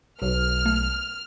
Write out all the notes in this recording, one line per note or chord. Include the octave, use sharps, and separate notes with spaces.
B1 F6
A3